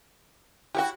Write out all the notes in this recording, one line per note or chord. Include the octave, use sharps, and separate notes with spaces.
E4 F#4 G4 C#5 G5